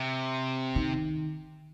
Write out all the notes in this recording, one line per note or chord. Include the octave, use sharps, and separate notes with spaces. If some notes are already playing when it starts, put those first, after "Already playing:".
Already playing: C3
D#3